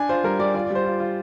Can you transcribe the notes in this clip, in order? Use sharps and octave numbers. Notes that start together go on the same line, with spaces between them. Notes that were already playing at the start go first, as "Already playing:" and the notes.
Already playing: D4 G#5
F4 C5
G3 A#4
G3 D5
F4 D5
D5
G3 C5
F4
F4